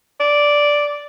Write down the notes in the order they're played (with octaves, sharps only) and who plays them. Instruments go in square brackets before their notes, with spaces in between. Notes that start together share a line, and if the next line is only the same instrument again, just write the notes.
[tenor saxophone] D5